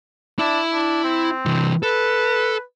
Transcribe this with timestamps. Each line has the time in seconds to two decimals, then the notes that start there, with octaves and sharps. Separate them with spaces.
0.39 D4 E4 E5
0.73 D4
1.04 C4
1.46 C3 E3
1.83 A4 B4